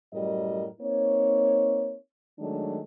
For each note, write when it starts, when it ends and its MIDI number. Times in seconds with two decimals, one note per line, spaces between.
0.14 0.66 42
0.14 0.66 45
0.14 0.66 55
0.14 0.66 70
0.14 0.66 75
0.80 1.95 58
0.80 1.95 60
0.80 1.95 63
0.80 1.95 73
2.39 2.79 51
2.39 2.79 54
2.39 2.79 56
2.39 2.79 57
2.39 2.79 62